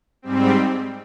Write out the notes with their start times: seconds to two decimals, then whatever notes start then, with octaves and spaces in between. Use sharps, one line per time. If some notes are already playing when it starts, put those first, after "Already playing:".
0.22 G#2 G3 C4